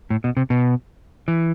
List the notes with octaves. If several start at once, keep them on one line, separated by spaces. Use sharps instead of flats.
A2
B2
C3
B2
E3